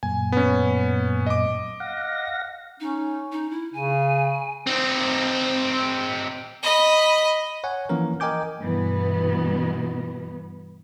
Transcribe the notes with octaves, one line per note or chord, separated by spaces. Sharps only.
F#2 A#2 G#5
B3 C#4
D#5 D6
F5 F#5 A#6
C#4 D#4
D#4
E4
C#3 G#5
C4 D#4
D#5 B5
C#5 F#5 G#5
E3 F3 A#3 C#4 A#4
A#4 D#5 G5 G#5 D6 G6
G2 B2 E3 B3